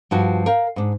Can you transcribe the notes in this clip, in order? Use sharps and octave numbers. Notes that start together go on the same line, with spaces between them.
G2 F3 F#4
A#4 F5 G5
G#2 D4